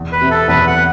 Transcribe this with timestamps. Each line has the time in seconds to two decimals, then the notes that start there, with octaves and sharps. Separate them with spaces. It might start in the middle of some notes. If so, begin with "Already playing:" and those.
Already playing: E2
0.12 B4
0.21 C3
0.31 A4
0.48 E2 B4
0.67 F#5